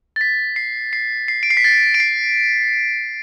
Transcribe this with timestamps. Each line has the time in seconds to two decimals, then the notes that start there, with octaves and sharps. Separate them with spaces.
0.16 A6
0.21 B6
0.56 C7
0.93 C7
1.28 C7
1.43 D7
1.50 C7
1.57 B6
1.64 A6
1.94 D7
2.00 C7